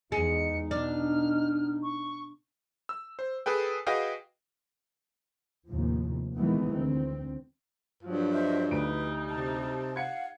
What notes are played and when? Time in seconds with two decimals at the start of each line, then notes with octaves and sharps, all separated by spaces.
0.12 E2 G#3 D#4 C#7
0.71 B2 D4 F6
1.83 C#6
2.89 E6
3.19 C5
3.46 G#4 A4 B4 G5
3.87 F#4 G#4 B4 D#5 F5 G5
5.68 D#2 A2 C3 F3
6.37 A#2 D#3 E3 G3 G#3 B3
6.74 D2 C4
8.03 G2 F3 F#3
8.31 C5 D#5 E5
8.71 D2 G3 D#4 B4 D7
9.29 C3 A5
9.96 F5 F#5 G#6 C#7